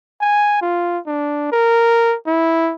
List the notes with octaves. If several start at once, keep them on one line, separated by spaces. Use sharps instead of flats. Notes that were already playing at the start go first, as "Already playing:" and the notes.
G#5
F4
D4
A#4
E4